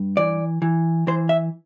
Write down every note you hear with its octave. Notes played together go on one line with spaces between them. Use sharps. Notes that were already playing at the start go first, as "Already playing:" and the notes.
Already playing: G2
E3 D5
E3
E3 C5
E5